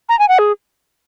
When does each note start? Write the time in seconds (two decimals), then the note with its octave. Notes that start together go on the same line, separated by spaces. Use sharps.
0.09 A#5
0.19 G#5
0.28 F#5
0.39 G#4